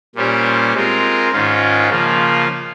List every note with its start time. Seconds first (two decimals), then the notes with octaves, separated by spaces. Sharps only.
0.15 A#2 G3 C#4 G4 C5
0.74 G#3 C4 F4 A#4
1.32 G#2 D#3 G#3 C#4 F4
1.89 C#3 F3 A#3 F4